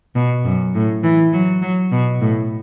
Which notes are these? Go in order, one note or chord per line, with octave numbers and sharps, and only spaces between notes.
B2
F#2
A2
E3
F#3
F#3
B2
A2